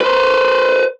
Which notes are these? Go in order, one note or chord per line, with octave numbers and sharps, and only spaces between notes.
B4 C5